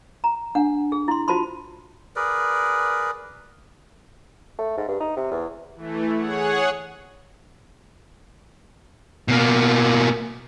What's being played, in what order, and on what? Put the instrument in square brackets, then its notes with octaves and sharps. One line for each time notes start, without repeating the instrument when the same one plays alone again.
[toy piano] A#5
D4 F#5
G#4
E4 C6
F4 F#4 C5 A5 B5 C6
[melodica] G#4 A#4 B4 D5
[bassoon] A3
G#2
G2
D#4
C3
E2
[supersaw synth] E3 A3
G#4 C#5 F#5
[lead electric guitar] B2 A#3